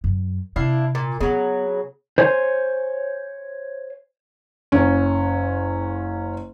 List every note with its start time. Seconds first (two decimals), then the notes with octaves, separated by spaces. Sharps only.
0.04 F#2
0.56 C3 D4 E4 F5
0.95 A#2
1.21 C#3 F#3 B3
2.18 C5 C#5 G#5
4.72 F#1 C#4